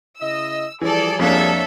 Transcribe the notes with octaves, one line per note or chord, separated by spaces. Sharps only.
C#3 E4 D#5 E6
E3 F3 G3 G#4 A4 D5
F2 A#3 D4 A4 C#5 E5